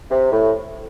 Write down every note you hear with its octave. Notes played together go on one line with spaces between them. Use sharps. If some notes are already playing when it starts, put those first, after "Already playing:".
C3
A2